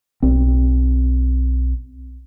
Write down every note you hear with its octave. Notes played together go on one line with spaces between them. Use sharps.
B1 C4